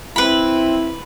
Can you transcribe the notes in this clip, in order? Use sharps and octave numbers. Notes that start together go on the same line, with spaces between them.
C4 E4 B4 B5